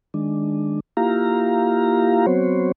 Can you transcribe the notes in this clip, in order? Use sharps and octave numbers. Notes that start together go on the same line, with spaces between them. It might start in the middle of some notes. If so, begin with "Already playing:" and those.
D#3 G#3 D4
A#3 E4 F4 G4 F5 A#5
F#3 B3 C4 F#4 C5 C#5